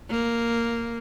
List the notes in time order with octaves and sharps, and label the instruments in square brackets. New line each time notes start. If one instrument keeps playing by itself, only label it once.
[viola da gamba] A#3